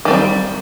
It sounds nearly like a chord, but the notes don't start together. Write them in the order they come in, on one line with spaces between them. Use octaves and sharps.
D#3 A3 C4 G3